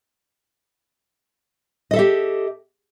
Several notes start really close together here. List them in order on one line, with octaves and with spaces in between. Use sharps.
D#5 A4 E5 G4